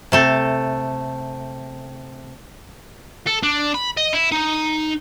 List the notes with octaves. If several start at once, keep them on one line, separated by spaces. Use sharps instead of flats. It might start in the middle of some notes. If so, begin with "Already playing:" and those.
C3 A3 A4
A4
D4
B5
D#5
E4
D#4